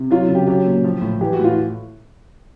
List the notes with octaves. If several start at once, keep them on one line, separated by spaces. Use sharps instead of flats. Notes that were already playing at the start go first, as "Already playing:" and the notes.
Already playing: C3
F#3 F4
C#3
G4
F#3 G4
A#2
F3
A2
E3 G4
F#4
A2 F4